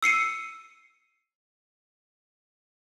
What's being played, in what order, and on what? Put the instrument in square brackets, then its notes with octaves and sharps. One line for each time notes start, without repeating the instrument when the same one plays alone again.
[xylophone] E6 C7 C#7 D#7